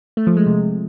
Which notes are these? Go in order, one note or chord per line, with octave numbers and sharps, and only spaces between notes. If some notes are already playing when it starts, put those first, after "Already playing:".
A3
F3
G#3
C3